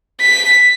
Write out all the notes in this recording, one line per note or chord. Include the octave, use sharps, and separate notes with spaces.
B6